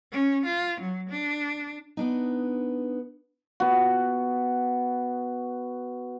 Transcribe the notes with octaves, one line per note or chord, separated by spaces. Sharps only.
C#4
F4
F#3
D4
B3 D4 D#4
B3 F#4